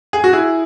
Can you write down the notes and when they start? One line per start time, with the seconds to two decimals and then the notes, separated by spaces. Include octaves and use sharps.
0.13 G#4
0.24 F#4
0.33 E4 G#4